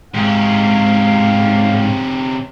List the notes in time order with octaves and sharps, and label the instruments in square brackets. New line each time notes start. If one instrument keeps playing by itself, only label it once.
[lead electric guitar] G#2 [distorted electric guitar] C3 C#4 [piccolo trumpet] F5